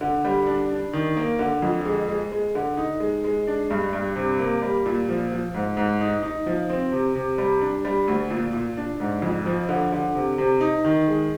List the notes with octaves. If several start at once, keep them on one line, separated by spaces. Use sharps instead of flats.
D3
G3
D4
D4
D#3
A#3
D3
F2
G#3
G#3
G#3
D3
D#4
G#3
G#3
D4
G2
G2
C3
A#3
G3
A#2
F3
F3
G#2
G#2
D#4
D#4
F3
C4
C3
C3
G3
D4
G3
D2
A#2
A#2
D4
G#2
F2
F3
D3
D3
C3
C3
D#4
D#3
G#3